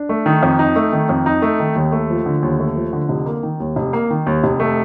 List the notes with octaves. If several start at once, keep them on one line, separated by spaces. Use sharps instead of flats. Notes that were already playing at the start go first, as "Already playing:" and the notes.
Already playing: D4
A3
D#3
F2
D#4
A3
D#3
F2
D#4
A3
D#3
D#2
A3
F3
D3
D#2
A3
F3
D3
F1
A#3
D#3
D#2
F1
A#3
D#3
D#2
F1
A3